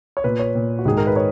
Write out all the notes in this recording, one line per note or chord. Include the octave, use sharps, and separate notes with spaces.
C#5
A#2 B4
C#5
A#2
F#4
G#2 D#3 G#4
A#4
B4
C#5